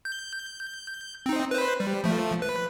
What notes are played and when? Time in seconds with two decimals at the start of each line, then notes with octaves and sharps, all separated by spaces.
0.05 G6
1.26 C4 D#4
1.51 B4 C5
1.80 G3
2.04 F3 A3
2.42 B4